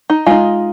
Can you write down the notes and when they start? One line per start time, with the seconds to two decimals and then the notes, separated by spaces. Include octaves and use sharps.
0.10 D#4
0.26 G#3 D#4 F4